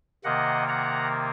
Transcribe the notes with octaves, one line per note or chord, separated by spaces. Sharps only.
C3 D#3 A#3 D#5 F#5
F#5 A#5